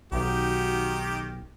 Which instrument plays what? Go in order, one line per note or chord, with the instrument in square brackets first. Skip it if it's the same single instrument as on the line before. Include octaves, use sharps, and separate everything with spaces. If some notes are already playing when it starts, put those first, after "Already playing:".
[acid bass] B1 [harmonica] D#3 G4 [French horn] F#4